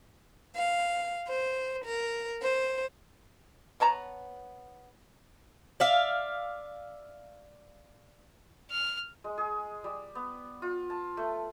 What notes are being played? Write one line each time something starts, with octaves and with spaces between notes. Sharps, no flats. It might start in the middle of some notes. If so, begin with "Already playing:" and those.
F5
C5
A#4
C5
B3 C#5 A5 A#5
D5 E5 F5
F6
G#3
G#4
G3
B3
F4
A5
A3